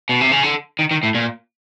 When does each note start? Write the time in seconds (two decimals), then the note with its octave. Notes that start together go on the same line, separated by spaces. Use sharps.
0.09 B2
0.21 C3
0.31 C#3
0.43 D3
0.79 D#3
0.91 D#3
1.03 A2
1.15 A#2